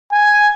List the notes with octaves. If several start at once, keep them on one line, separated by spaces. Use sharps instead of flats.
G#5